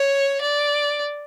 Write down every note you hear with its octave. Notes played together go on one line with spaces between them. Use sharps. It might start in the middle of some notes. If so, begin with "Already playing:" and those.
Already playing: C#5
D5